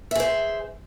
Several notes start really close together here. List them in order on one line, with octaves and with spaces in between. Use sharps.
E5 G#4 C5